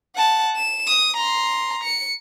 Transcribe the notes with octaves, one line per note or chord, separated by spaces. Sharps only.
F#5 A5
E7
D#6
A#5 C6
C#7